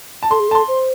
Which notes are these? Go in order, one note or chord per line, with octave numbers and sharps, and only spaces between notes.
A5
A4 C6
G#4
A4 A5
C6
C5